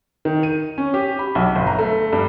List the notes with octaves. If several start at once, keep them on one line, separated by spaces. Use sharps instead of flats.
D#3
D#7
C#4
G4
B5
B1
G1
A#5
A3
G2